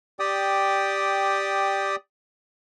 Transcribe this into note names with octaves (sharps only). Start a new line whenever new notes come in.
G4 D5 G5 D#6